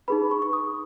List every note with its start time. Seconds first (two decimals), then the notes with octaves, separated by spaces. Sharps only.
0.08 D#4 G#4 B4 B5
0.31 C#6
0.42 C#6
0.53 D#6